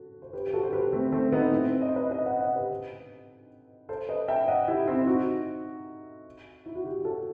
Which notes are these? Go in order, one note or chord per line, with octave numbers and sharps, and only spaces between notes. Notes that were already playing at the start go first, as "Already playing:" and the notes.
Already playing: F#4 A4
C5
G4 B4
G4
F#4 A4
C5
G4 B4
A3 C4
A3 C4
B3 D#4
C4 E4
D#5
C5
B4 D#5
B4 D#5
D#5 F#5
D#5 F#5
G4 B4
A4 C5
B4 D#5
E5 G5
D#5 F#5
E4 G4
C4 E4
D#4 F#4
E4
F#4
E4 G4
F#4 A4